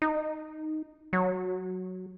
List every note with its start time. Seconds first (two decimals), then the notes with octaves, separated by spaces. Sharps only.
0.02 D#4
1.13 F#3